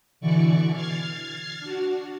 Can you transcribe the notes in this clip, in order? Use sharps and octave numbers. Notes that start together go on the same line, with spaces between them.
B2 D3 E3 D5 C#6
F6 G#6 A6 C7
D4 F#4